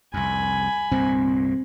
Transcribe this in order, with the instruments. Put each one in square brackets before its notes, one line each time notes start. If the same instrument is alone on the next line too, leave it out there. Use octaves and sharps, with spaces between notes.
[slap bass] C2 F2 [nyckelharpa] G#5 B5
[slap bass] C2 G2 A#2 [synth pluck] C4